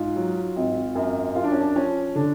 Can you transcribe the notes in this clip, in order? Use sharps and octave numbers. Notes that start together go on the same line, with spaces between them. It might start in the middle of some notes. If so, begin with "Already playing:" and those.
Already playing: G#2 F4
F#3
G#1
F#2
F#2 F4
D4
C#4
D4
F3 C#4
D3 D4